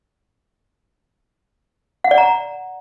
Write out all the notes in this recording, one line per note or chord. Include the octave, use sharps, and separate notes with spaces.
F#5
D5
A#5